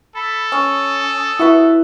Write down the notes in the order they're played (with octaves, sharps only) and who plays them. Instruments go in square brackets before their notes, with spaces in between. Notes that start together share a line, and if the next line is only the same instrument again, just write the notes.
[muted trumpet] A4 [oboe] B5
[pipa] C#4 [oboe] D#6
[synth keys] E4 E5 [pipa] F#4 B4